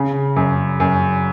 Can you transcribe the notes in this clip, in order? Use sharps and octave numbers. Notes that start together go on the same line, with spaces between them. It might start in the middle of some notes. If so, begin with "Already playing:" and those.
Already playing: C#3
F#2
F#2